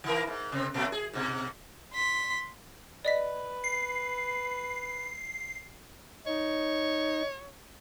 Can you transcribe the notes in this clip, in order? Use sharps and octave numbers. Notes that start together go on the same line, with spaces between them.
D#3 E3 A#4
G#2
C3 C4
A#2 F#3 A3
G#4
G#2 B2
C6 B6
B4 D5 D#5 B6
C7
D#4 C#5